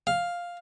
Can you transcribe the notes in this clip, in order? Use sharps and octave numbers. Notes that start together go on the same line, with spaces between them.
F5